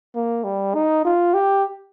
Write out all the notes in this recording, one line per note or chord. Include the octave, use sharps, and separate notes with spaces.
A#3
G3
D#4
F4
G4